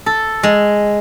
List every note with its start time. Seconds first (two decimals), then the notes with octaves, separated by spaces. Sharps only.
0.06 A4
0.43 G#3